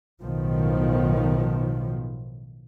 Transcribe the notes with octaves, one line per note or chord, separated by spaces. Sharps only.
B1 A2 D#3 F3 B3